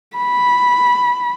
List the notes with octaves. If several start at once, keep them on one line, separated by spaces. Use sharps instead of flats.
B5